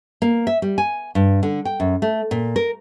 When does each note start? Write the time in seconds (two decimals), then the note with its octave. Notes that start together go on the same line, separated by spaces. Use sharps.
0.22 A#3
0.47 E5
0.62 G3
0.78 G#5
1.15 G2
1.43 D3
1.65 G5
1.80 F#2
2.02 A3
2.31 A#2
2.56 A#4